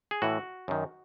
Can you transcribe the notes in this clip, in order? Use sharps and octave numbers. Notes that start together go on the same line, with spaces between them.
G#4
A2 E3 F#4
F#2 D#3